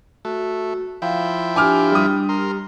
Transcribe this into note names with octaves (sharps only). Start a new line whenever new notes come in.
A3 F#4
F3 E4 F5 G5
D4 G4 G#5 D6 F6
G3 D#6
A#4 C6